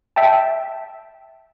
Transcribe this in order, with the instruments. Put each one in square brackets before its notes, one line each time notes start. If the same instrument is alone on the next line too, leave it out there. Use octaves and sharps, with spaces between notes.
[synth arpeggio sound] E5 G5 A5